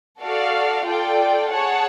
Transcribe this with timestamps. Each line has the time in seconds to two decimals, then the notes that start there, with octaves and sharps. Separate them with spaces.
0.20 F#4 A4 D5 F5
0.86 F4 A4 D5 G5
1.52 G#4 C#5 F#5 A5